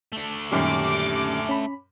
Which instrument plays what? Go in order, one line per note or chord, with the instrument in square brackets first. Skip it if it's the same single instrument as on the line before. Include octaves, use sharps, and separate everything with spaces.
[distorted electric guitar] A3 D4
[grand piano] F#2 A#2 G3 [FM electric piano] D#3 C#4 G4 [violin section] D6
[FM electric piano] C#4 B5